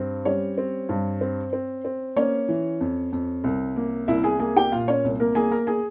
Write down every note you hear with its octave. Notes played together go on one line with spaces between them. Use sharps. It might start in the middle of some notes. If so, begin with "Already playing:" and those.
Already playing: G2 C4
G3 C#4 C#5
C4
G2
C4
C4
C4
A#3 C#4 C#5
E3
F2
F2
C2
A#3
C2 E4 E5
G#4 G#5
A#3 G#4 G#5
G4 G5
A#2 F4 F5
C#4 C#5
C2
A#3 A#4
A#3 G#4 G#5
A#4 A#5
G#4 G#5